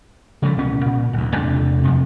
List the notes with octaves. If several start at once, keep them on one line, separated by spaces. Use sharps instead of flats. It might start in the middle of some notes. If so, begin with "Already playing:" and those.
C#3 F3 A3
C#2 B2 C#4
A#2
D1 D2
E2 C3 A3 D4
F2 C3